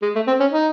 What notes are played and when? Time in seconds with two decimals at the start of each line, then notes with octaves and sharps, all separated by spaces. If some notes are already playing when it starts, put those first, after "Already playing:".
0.02 G#3
0.16 A3
0.27 C4
0.40 C#4
0.53 D#4